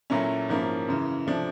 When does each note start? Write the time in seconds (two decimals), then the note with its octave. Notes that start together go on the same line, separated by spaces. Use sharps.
0.10 A#2 F#3 A3 C#4 E4
0.49 G#2 F3 A#3 C#4 E4
0.88 F#2 C#3 E3
1.27 C3 F3 A3 D4